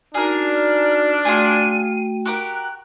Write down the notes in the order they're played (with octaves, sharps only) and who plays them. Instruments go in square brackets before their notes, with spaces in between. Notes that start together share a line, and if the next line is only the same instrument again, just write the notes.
[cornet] D4 [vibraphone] D#4 F#4 D5 [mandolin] G#4 A#4 [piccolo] F6
[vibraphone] A3 F#4 G5 [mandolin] F4 G#4 G#5 [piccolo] D#7
[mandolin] F#4 G4 A#4 [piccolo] F#6